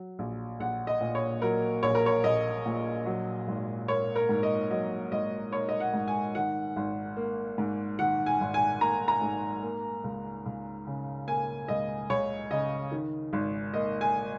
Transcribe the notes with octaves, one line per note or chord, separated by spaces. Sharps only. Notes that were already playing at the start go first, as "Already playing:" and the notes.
Already playing: F#3
A#1
A#1 F#5
D#5
A#2
C#5
F#3 A#4
A#1 C#5
A#4
C#5
A#1 D#5
A#2
F#3
G#1
A#3 C#5
A#4
G#2
D#5
F#3 D#5
G#1 D#5
A#3 C#5
D#5
F#5
G#2
G#5
D#3 F#5
G#1
A#3
G#2
D#3 F#5
G#5
G#1
G#5
A#3 A#5
A#5
G#2
A#3
C#2
C#2
C#3
A#3 G#5
C#2 D#5
C#2 C#5
C#3 D#5
D#3
G#1
A#3 D#5
G#5